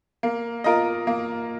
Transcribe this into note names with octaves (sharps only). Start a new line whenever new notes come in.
A#3
F4 A#4 D#5
A#3